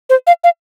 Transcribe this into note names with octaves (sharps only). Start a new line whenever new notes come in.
C5
F5
F5